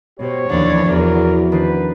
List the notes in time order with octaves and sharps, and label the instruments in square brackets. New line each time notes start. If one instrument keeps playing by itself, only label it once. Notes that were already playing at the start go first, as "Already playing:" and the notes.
[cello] B2 [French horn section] G4 C5 [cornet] C#5
[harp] F1 F3 F#5 [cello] D#2 D4 [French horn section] E3
[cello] E2 [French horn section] B3 E4 F#4 [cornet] A#4 [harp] C#5
[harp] D#3 D4 C5 [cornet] B4